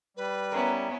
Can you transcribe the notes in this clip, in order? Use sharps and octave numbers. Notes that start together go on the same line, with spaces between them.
G3 B4
B3 C#4 E4 A#4